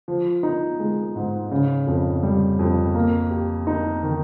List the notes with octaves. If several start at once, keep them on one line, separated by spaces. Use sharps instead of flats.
F3
D#4
G#3
G#2
C#3
F2
G3
F2
A#3
G4
D#4
D#3